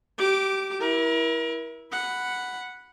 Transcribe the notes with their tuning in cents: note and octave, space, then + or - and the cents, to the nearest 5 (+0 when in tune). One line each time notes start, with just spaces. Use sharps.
G4 -20 D6 +0
E4 -5 A#4 +35
F#5 +0 B5 +0